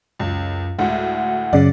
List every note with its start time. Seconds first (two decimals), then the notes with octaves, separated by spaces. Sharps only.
0.19 C#2 F#2
0.79 D2 A2 G#3 F#5
1.53 F#2 C#3 D5